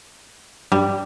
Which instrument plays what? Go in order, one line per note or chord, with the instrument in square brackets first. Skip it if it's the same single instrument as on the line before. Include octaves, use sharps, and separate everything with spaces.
[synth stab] G2 [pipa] G3